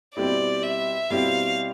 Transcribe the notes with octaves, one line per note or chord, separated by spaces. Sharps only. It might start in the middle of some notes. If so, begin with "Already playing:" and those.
B2 G3 C4 E4 G4 D5
E5
B2 G3 C4 E4 G4 F5